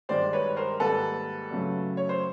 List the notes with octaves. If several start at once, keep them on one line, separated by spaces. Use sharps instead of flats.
G2 D#3 G#3 C5 D5
B4 C#5
A#4 C5
G#2 D#3 G3 A#3 A4 B4
F#2 C#3 F#3 A3
C#5
C5